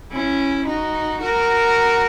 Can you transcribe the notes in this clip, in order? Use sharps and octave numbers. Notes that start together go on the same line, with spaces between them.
C#4 E4
D#4 F#4
F#4 A#4